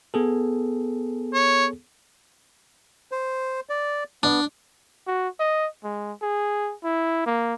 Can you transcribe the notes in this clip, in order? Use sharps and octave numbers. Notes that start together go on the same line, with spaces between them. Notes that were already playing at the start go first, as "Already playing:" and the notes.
B3 G#4 A4
C#5
C5
D5
B3 D4
F#4
D#5
G#3
G#4
E4
A#3